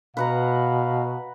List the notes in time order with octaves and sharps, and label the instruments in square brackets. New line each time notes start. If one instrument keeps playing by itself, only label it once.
[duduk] B2 [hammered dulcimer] B4 F#5 A#5 [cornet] F5